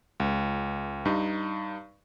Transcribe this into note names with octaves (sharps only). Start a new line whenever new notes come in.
C#2
G2 D#4